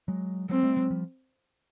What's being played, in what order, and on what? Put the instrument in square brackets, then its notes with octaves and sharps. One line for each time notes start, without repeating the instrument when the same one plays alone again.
[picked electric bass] F#3 G#3
[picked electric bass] F#3 G#3 [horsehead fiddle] C4
[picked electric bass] G3 A3
F#3 G#3
F3 G3